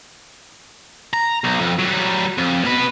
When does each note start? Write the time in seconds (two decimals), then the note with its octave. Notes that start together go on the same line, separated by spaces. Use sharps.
1.14 A#5
1.44 B1
1.60 F2
1.79 F#3 G3
2.38 F2
2.65 B2 B4